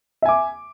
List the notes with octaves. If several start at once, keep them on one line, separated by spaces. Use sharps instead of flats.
E5 G#5 D6